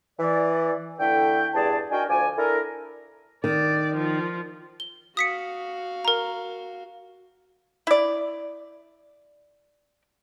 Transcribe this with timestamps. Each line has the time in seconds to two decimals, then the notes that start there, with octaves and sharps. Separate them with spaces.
0.20 E3 D5
1.00 D3 A3 E4 G5
1.54 E2 G2 G#4 D5 A5
1.91 D4 D#4 F#4 A#4 G5 G#5
2.09 D2 F3 D5 G#5
2.38 D4 E4 A4 A#4
3.44 D#3 D5
3.95 F3
4.80 G7
5.17 F#4 F5 D#6 B6 C#7
6.05 A#4 A#5
7.87 E4 D5